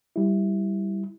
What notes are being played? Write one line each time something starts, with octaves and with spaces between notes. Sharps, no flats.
G3 E4